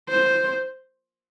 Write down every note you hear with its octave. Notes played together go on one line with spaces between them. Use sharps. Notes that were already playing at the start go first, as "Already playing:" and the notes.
C5